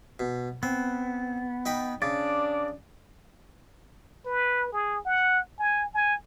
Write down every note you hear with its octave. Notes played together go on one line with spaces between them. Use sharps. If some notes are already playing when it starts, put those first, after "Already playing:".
B2
B3 C4
D#4 G5 B5
C#3 D4 D5
B4
G#4
F#5
G#5
G#5